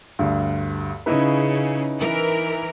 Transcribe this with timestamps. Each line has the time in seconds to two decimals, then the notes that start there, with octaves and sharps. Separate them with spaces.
0.19 D2 G2
1.06 C#3 D#4 E4 B4
1.99 E3 A#4